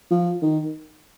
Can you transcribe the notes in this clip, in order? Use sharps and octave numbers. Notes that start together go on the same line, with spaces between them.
F3
D#3